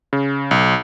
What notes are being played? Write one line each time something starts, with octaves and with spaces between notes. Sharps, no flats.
C#3
B1